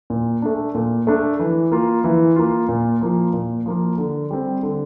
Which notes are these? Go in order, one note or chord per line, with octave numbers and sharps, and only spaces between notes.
A#2
A3 D4
A#2
A3 D4
E3
A#3 F4
E3
A#3 F4
A#2
F3 A#3 F4
A#2
F3 A#3 F4
D3
G3 C4
D3